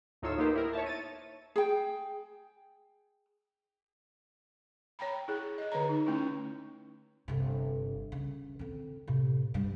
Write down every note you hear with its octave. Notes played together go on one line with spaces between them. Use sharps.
D2 A2 D#4 F4 C#5 E6
A#3 B3 D#4 G4 C5
E4 A#4
C#5 E5 A5
A6 D#7
G#4 G5
C#5 G5 A#5 B5
E4 G#4
G#4 D#5
D3 C#5 A#5
D#4
A3 C#4 E4
G1 C3
C#3
D3 C4
A2 C3
G2 G3